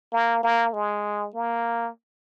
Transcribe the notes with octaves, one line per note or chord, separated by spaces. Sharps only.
A#3
A#3
G#3
A#3